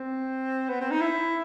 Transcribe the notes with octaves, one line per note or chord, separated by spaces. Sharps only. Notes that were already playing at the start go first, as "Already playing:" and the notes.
Already playing: C4
B3
C4
D#4
E4